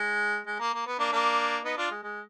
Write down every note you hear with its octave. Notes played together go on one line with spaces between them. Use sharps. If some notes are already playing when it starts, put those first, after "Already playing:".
Already playing: G#3
G#3
A#3
A#3
B3
A#3 D4
A#3 D4
B3 D#4
D4 F4
G#3
G#3